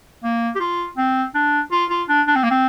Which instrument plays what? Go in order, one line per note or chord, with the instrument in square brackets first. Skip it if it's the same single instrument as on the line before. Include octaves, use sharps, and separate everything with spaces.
[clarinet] A#3
G4
F4
C4
D4
F4
F4
D4
D4
C4
A#3
C4